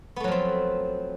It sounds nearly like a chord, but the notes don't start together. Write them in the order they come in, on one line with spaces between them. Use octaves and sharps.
B3 A3 F#3 F3 C4